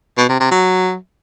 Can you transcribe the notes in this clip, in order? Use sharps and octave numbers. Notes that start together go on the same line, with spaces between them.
B2
C3
C3
F#3